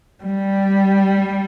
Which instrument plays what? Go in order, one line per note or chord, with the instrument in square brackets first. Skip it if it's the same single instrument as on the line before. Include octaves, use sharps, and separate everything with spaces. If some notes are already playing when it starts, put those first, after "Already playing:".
[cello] G3